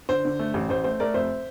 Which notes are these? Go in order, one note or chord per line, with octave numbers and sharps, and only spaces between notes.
D3 C5
D3
A3
A1
A1 C5
A3 C5
A3 A#4 D5
F1 C5 E5